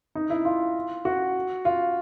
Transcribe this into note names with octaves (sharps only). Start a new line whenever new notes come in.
D#4
E4
F4
F#4
F4